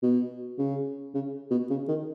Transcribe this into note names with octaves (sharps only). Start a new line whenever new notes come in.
B2
C#3
C#3
B2
C#3
D#3